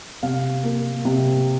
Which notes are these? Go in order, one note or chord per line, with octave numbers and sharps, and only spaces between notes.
C3 F5
A#3
C3